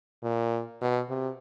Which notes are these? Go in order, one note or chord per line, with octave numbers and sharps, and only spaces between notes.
A#2
B2
C3